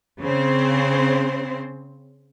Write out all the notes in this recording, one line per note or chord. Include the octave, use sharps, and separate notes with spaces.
C#3 C4 C5